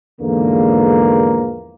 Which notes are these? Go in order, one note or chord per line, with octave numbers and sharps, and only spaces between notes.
E2 G#2 D3 E3 F3 A#3